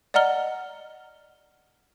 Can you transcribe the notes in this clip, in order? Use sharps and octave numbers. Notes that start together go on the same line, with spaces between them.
D5 D#5 F#5 A#5 F6 G7